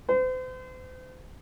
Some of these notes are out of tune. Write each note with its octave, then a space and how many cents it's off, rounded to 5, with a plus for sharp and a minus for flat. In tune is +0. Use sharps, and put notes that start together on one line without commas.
C5 -40